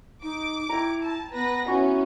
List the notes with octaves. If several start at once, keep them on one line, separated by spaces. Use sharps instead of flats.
D#4 D6
E4 G5 A#5
A5
B3 B4 A#6
C#4 E4 F#4 F5